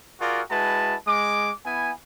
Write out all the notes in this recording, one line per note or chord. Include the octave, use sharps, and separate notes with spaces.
F4 F#4 G#4 A#4 D5
G#3 E4 F#4 B4 A5
G#3 D6
B3 E4 G#5